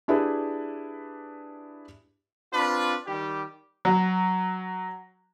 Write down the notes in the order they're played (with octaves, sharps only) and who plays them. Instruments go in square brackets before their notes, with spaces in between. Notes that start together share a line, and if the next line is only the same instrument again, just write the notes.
[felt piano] D4 E4 G4 G#4 B4
[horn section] C4 D4 F4 B4
D#3 G3 G4
[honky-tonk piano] F#3